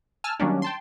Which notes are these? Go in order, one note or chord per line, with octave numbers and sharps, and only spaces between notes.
G#5 A5 E6 F6
D#3 F#3 G3 A#3 C#4 D4
G5 A5 C6